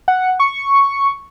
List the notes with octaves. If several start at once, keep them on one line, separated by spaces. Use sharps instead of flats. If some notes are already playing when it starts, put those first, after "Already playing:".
F#5
C#6